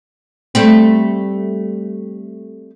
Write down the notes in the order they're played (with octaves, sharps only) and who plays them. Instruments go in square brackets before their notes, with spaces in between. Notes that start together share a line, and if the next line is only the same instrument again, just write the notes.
[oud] G3 A3 C4